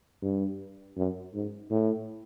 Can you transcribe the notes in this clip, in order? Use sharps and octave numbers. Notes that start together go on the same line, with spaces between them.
G2
F#2
G#2
A2